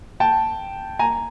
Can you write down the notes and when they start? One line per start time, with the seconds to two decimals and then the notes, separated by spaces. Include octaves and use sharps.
0.20 G5 A5
0.99 G#5 A#5